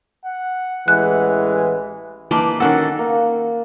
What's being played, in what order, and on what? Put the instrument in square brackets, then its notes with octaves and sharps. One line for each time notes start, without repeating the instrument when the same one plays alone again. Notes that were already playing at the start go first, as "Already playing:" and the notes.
[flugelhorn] F#5
[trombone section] A1 E3 G#3 [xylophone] F#6
[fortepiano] E3 A5 D6 [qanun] A#3 B4 G5
[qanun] D#3 F#4 A4 [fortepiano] C#4 A#4 E6 [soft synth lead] F#5
[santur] A#3